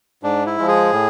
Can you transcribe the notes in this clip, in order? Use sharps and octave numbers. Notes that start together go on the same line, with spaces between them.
G#2 D4
E4
F3 G#3
G#4
A2